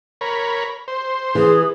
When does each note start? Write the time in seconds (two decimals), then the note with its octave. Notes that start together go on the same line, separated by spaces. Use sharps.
0.21 A#4 C#5 B5
0.88 C5
1.35 E3 G#4